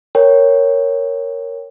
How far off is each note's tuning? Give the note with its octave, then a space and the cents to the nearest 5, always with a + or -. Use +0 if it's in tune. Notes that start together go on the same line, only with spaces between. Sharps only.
A#4 +0 C#5 +0 G5 +0